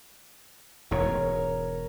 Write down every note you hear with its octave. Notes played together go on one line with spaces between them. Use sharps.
E1 G#2 A#4 C#5